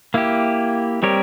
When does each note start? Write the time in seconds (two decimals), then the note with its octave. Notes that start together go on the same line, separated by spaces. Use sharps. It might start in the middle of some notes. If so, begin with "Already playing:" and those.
0.14 A#3 E4 G4
1.03 G3 C4 G4 A#4 C#5